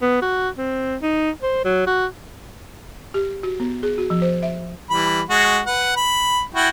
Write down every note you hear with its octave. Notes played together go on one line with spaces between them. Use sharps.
B3
F#4
C4
D#4
C5
F#3
F#4
G4
F#4
B3
G#4
F#4
F3
C5
E5
E3 G3 B5
G#3 F#4
B4 F#5
B5
E4 F#4 G5